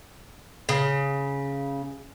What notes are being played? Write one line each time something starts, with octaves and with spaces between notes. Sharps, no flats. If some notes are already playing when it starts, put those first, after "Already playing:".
C#3